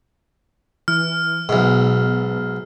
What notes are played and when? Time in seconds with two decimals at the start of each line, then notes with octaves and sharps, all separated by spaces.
0.88 E3 F6
1.49 B1 G#2 B2